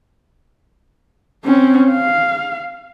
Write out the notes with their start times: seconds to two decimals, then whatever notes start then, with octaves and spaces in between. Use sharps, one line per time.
1.45 C4 C#4
1.90 F5